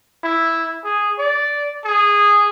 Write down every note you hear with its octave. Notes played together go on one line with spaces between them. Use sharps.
E4
G#4
D5
G#4